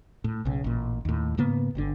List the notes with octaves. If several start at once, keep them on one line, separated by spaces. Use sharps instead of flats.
A2
B1 C#3
A1 A#2
D#2 A2
G#2 C#3 A#3 B3
G1 A#2 D3